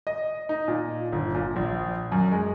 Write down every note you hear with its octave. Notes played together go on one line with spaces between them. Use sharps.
D#5
D#4
A#2
G1
A#2
A#1
F#2
G#3